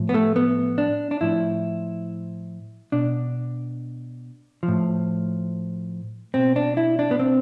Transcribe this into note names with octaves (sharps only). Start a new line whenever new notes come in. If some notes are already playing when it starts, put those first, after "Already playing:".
Already playing: A2 F3
B3
A3
B3
D4
D4
A2 F3 E4
B2 D4
F3
A2
B2 C4
D4
E4
D4
B3
C4